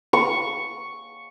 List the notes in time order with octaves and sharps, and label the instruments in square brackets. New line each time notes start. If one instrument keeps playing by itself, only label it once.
[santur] C#6